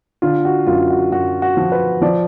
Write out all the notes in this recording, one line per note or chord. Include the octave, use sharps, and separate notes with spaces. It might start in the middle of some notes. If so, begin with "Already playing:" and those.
D3 F4
F#4
F#2 F4
F#4
F#2 F#4
F#4
F3
B4
F3 D5